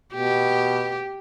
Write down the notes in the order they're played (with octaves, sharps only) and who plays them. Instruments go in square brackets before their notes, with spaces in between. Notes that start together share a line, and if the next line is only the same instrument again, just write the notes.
[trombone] B2 [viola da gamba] G4